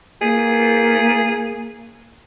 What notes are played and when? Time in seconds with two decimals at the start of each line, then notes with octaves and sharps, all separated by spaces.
0.22 A#3 G#4